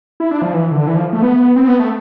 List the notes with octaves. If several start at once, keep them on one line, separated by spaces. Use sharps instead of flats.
E4
D4
F3
E3
D3
E3
F3
A3
B3
C4
B3
A3